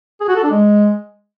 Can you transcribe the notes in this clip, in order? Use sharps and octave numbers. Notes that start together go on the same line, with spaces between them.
G#4
F#4
A4
D4
G#3